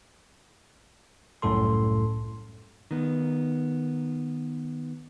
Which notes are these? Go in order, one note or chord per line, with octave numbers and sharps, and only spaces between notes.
C2 F#2 A2 A4 C6
D#3 B3